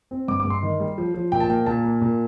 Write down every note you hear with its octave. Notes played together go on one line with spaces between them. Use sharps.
C4
G2 D6
G2 D6
C6
D#3
G3
F3
F3
A#2 G5
A5
A#3 G5
A#2 A5
A#3
A#2